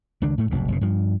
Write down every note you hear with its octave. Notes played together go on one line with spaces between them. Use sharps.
C#2 D#3 D4
A2 A3
F1 B1 G#2
F#1 B2
G2 F3